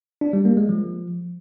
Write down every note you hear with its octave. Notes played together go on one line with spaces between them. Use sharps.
D4
G3
A#3
G#3
F3